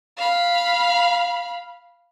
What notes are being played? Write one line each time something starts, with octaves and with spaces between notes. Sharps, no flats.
F5 B5